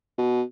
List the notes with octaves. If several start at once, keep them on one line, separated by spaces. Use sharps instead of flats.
B2